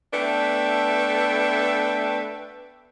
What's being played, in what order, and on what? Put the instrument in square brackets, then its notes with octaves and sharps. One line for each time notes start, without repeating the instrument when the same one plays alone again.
[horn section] A3 B3 D4 B4 E5 G5